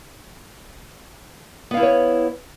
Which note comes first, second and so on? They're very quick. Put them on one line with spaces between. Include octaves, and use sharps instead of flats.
B3 F5 E4 B4 C#5